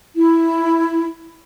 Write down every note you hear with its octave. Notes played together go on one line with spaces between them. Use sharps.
E4